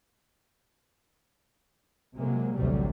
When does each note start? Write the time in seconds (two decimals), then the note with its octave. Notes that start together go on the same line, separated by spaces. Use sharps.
2.18 C3 F#3 G#3 A#3
2.56 A1 D2 A2 C3 F#3 G3